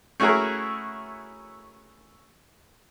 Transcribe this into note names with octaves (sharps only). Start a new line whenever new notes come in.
A3 C#4 E4 F#4 G#4 A#4